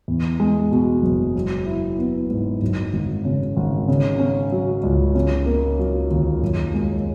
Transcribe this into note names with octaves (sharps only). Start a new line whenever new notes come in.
E2
G#3
B2
F#1
F#3
E4
B3
G#2
F#2
G#1
C#3
G#1
C#3
C#4
F#3
C#2
C#3
A#3
F#3
D#2
F#2
G#3